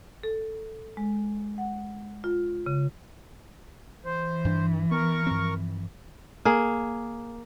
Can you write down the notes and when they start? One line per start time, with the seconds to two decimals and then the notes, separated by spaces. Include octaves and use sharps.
0.23 A4
0.97 G#3
1.58 F#5
2.24 F4
2.66 C#3
4.05 E3 C5
4.45 G2 D4
4.91 B3 A#4 C#6
5.27 G2 F3 C4
6.45 A#3 G#4